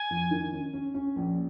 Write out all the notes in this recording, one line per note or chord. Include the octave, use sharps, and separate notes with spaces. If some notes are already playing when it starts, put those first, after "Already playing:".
Already playing: G#5
F2
D#3
C#4
C#4
C#4
A#1